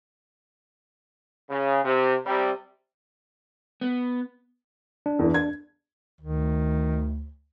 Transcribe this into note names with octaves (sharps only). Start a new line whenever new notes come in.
C#3
C3
C3 G3
B3
D4
E2 E3
G#6
D2 D#3